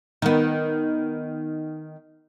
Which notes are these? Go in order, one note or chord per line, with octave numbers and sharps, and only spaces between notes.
D#3 B3